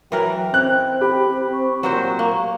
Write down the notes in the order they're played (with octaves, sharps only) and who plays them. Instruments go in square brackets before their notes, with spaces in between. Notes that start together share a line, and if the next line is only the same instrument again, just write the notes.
[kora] E3 A#4 B4 [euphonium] F#3 [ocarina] G5
[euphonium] C4 [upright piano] F#6
[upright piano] G4 [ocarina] B5
[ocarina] C#6
[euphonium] A#2 [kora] F#3 F#4 C5
[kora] A#3